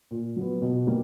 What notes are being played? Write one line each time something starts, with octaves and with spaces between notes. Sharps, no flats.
A#2
F#3 B3
B2
G3 A#3